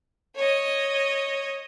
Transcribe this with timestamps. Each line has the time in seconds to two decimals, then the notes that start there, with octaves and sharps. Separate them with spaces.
0.35 C#5 D#5